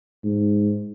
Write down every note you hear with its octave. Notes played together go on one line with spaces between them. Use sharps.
G#2